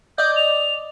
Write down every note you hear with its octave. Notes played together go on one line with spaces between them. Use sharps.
D5 D#5 G6
F7